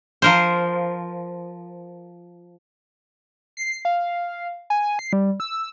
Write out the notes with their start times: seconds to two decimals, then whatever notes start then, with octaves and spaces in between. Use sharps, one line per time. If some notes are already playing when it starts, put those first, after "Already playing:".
0.22 F3 A#4 C5
3.57 C7
3.85 F5
4.70 G#5
4.99 C7
5.13 G3
5.40 E6